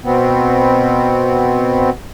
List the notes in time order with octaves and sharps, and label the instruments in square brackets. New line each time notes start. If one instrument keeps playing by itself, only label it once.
[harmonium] B2 B3 C4